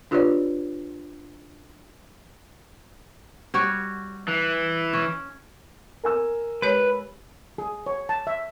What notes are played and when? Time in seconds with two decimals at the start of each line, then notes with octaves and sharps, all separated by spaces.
0.11 D4 F4 G4 B4 C#5 D5
3.54 G3 F#4 C#5
4.28 E3
4.93 C#4
6.04 A#4 G#5 E6
6.62 G#3 G4 B4 C#5
7.58 G#4
7.86 C#5
8.09 A5
8.27 E5